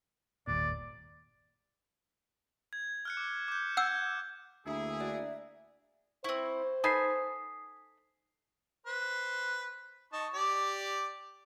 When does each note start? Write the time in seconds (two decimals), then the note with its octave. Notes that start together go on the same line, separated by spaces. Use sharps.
0.47 G1 D#2 A#2 D5
2.73 G#6
3.05 F6 F#6 C#7
3.17 D6
3.48 D6 G6
3.77 F#5 E6 F6 G6 G#6
4.66 D2 A#3 E4 G#4 E5
5.00 F#4 D5
6.24 C4 E4 C5 C#6
6.84 D#4 A4 B4 G#5 D#6 B6 C7
8.86 B4 C5
10.13 D#4 A5 C#6
10.34 G4 D5